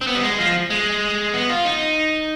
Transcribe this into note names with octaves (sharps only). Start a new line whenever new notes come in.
C4
B3
G3
G#3
F3
G#3
B3
F4
D#4